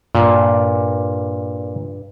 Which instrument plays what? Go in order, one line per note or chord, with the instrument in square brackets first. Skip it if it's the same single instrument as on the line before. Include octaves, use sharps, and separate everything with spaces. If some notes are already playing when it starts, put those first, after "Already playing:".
[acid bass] G2 [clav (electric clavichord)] A#2